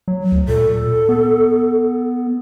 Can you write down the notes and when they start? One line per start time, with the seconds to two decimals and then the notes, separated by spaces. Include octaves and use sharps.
0.08 F#3
0.32 D2
0.48 A#2 A4
1.09 B3